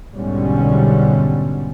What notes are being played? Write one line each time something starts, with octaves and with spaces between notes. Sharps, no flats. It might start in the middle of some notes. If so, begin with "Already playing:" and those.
B1 G#2 B2 D3 G3 C#4